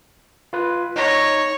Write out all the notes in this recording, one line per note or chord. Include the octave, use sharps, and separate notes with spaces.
F4 B4
D#4 C#5 A#6